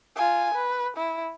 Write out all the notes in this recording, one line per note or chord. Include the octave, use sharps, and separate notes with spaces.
F4 G#5
B4
E4